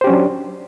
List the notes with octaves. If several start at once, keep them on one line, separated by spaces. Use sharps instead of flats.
F#3 C#4 D4 G4 C5